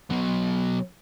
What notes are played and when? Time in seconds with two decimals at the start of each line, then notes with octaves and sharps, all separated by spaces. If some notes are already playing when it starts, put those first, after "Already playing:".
0.10 B2 F#3